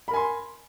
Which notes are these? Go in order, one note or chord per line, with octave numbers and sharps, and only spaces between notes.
A#4 G#5 B5 C6